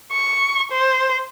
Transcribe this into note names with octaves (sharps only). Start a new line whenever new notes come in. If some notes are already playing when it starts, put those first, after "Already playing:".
C#6
C5